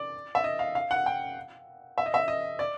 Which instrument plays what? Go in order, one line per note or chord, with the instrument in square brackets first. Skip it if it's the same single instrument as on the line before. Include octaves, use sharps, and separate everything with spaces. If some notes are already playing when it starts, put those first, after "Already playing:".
Already playing: [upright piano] D5
E5
D#5
F5
F5
F#5
G5
E5
D#5
E5
D#5
D5